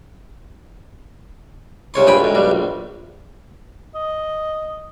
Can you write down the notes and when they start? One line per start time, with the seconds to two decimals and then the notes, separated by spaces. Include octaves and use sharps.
1.94 C2 C#3 C#5 C6
2.07 A#1 G2 G#4 G5 B5
2.21 D2 G#2
2.35 B1 G2 G3
2.51 A#1
3.95 D#5